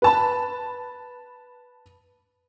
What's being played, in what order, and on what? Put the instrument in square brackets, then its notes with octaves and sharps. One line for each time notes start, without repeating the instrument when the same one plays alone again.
[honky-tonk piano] B4 A5 B5